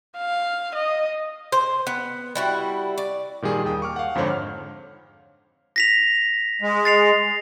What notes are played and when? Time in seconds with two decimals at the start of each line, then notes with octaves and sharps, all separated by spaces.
0.17 F5
0.75 D#5
1.52 C5
1.87 B3
2.35 G3 E4 F#4
2.98 D5
3.42 A#2 D#3 G3 G#4
3.65 D#2 G5 D#6
3.82 C#6 D6 F6
3.96 F5 F#5
4.15 F2 G#2 D3 C5 C#5
4.30 F6
5.76 A#6 B6 F7
6.62 G#3
6.85 A6 C7 F7